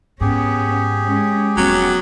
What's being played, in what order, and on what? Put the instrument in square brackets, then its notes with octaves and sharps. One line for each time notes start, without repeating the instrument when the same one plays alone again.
[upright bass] G#2 [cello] B3 C#4 [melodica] G4 G#4
[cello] G#3 C#4
[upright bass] E1 F3 [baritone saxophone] F#3 [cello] B3 C#4